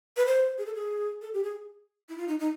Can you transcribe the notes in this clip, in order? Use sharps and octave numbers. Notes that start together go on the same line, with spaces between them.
B4
C5
G#4
A4
G#4
A4
G4
G#4
E4
F4
D#4
D#4